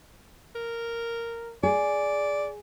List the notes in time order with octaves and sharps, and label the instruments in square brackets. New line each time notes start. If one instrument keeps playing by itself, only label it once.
[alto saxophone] A#4
[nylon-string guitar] G#4 [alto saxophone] D5